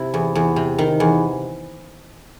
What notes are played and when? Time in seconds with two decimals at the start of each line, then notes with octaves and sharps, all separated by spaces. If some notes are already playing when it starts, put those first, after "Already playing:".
Already playing: C3 E4
0.14 E2
0.35 E2
0.56 C3
0.78 D#3
1.00 E2